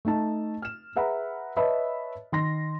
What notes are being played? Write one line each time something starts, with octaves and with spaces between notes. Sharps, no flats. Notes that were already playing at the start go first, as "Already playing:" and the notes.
A3 D#4 A5
F6 E7
G#4 B4 E5 F#5 A#5 B5
B4 C#5 D#5 E5 A5 B5
D#3 C6 A#6